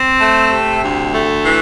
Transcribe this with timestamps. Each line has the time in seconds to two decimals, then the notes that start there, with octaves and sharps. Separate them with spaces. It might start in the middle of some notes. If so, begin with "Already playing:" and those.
Already playing: C4
0.21 A3
0.52 C3
0.83 D2
1.14 A3
1.45 E3